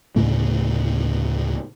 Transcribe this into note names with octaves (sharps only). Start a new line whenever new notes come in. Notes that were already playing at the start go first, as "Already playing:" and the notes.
D2 A2 C#3 A3